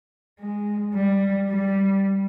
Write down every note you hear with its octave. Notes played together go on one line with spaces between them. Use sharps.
G#3
G3
G3